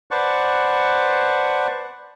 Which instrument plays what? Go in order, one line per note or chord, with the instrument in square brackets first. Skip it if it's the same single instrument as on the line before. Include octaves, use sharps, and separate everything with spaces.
[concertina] B4 C5 D5 F#5 A5 C#6